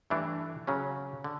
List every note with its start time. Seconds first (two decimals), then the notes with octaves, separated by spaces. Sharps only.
0.10 G2 E3 A3 D4
0.67 C#3 F#3 C#4
1.24 D3